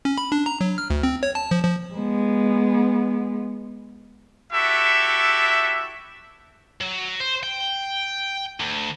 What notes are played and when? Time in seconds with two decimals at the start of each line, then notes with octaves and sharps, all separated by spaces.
0.05 C#4
0.18 B5
0.32 D4
0.46 A#5
0.61 F#3
0.78 F6
0.90 D2
1.03 C4
1.23 C#5
1.35 A5
1.51 F3
1.64 F3
1.95 G#3 B3
4.53 E4 F#4 G4 A4 E5
6.81 F#3
7.20 C5
7.43 G5
8.60 D2